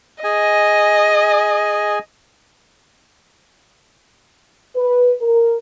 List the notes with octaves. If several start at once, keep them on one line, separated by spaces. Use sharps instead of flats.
G#4 D#5 G#5
B4
A#4